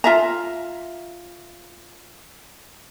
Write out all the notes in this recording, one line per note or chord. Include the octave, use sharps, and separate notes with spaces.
F4 E5 A#5